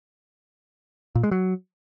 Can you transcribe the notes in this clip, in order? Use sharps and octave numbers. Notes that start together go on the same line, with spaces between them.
A#2
G#3
F#3